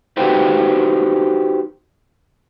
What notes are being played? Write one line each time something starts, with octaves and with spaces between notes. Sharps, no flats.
D#4 F#4 G4 B4 C5